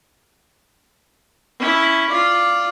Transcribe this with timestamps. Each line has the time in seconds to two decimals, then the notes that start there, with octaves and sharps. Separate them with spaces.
1.60 C#4 E4
2.09 F4 D5